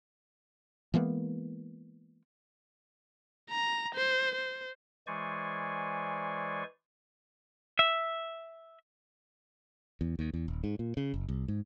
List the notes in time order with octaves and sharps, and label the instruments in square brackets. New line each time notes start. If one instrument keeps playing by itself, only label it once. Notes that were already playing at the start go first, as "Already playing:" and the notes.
[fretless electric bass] E3 G#3 A#3 B3
[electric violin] A#5
C5
C5
[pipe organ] E3 G#3 C5 D5 G#5 C#6
[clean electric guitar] E5
[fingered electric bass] E2
D#2
E2
D#1
G#2
A#2
C#3
F#1
C2
G#2